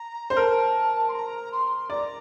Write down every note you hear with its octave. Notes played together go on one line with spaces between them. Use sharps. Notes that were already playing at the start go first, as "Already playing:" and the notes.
Already playing: A#5
C5
A#4 A5
C6
A#5
C6
D5 A#5